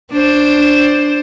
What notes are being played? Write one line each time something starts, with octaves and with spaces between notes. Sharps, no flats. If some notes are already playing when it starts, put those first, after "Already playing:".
D4 C5